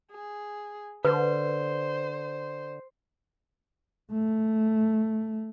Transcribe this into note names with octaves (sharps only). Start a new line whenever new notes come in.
G#4
D3 B4 C5
A3